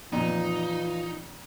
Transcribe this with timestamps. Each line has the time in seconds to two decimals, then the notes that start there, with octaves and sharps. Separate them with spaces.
0.12 F2 A#2 D#3 E3 D#4 F4